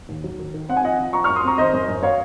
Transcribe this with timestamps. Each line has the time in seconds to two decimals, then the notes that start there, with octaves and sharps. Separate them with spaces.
0.09 D#2
0.24 F#3
0.39 D#3
0.54 D#3
0.69 C4 F#5
0.77 G#5
0.84 F3 D#5 F#5
0.98 F3
1.13 F3 A#5 C#6
1.24 C#6 F6
1.29 F#2
1.36 C6 D#6
1.44 C4 A#5 C#6
1.58 D#3 C5 D#5
1.73 F#2
1.89 F#2
2.03 C#5 F5